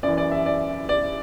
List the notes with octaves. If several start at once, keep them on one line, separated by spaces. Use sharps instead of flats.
F#2 E3 D5
D5
E5
D5
D5